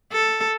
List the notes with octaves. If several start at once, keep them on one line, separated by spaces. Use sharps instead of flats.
A4